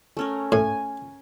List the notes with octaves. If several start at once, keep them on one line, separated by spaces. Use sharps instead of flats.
A3 C#4 A#4
A2 G#5